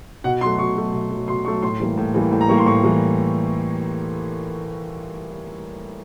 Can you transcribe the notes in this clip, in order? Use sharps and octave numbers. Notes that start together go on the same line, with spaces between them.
B2 F#5
F#3 A3 C6
B2 C#6
F#3 A3
B2
F#3 A3
B2 C6
F#3 A3 C#6
A2 C6
E3 G3 A#3
A2
E3 G3 A#3
A2
A#5
E3 G3 A#3 C#6
C6
A2 C#6
E3 G3 A#3